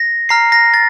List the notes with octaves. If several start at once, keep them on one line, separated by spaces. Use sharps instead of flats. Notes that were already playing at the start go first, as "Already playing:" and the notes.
Already playing: A#6
A#5 F6 C7
A#6
A6